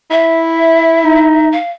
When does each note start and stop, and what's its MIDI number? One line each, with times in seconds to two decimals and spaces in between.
0.11 1.51 64
0.11 1.51 76
1.04 1.56 63
1.51 1.70 77